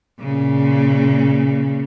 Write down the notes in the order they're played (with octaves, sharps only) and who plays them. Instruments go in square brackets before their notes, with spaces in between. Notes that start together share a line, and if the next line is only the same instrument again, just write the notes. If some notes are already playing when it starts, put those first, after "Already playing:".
[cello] A#2 C#3